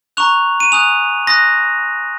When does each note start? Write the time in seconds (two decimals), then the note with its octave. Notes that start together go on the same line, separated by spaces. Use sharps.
0.17 A#5 C#6 F#6 F7
0.60 D#7
0.72 G#5 D#6 F#6 F7
1.27 C6 D#6 F#6 A#6